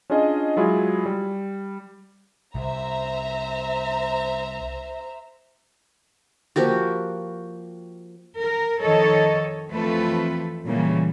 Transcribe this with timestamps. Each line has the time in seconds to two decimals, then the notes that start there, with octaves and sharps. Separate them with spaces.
0.10 C#4 D4 F4 G#4 D#5
0.57 F#3 G#3 E4 F4 G#4
1.06 G3
2.55 C2 C5 E5 A#5
6.56 F3 A#3 F#4 G4
8.38 A#4
8.81 F2 D#3 A4 C#5 D#5
9.71 F2 E3 A3 C4 F4 B4
10.65 A#2 C#3 E3 G3 A#3